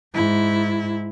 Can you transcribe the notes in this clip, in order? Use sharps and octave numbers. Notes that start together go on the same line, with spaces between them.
G#2 E4